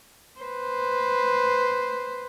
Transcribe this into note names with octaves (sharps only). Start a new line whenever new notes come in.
B4 C5